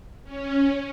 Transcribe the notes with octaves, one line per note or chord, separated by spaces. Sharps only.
C#4